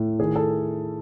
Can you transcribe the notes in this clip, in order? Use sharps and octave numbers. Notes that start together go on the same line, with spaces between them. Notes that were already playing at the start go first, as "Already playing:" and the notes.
Already playing: A2 A3
D#3 G#4
A4